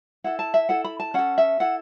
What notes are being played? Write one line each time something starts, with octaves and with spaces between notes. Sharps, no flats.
E4 A4 F#5
A5
E5
E4 A4 F#5
B5
A5
C#4 A4 F#5
E5
E4 A4 F#5